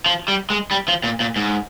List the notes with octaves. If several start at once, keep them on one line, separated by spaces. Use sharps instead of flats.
F3
G3
G#3
G3
F3
A#2
A#2
G#2